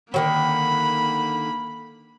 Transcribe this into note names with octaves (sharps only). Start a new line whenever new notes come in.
D3 D#3 F#3 A#3 B5